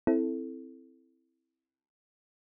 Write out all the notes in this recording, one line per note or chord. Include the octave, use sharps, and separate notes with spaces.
C4 E4 A4